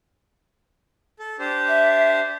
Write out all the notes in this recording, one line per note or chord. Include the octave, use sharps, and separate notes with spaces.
A4
D4 G4 C5
E5